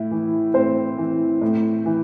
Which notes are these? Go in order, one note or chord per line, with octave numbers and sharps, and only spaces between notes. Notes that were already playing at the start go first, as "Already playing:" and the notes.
Already playing: A2 E4
E3
A2 C4 C5
E3
A2
E3